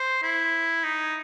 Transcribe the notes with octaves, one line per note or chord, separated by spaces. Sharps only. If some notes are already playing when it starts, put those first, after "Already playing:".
Already playing: C5
E4
D#4